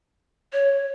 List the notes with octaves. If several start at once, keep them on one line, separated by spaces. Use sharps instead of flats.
C#5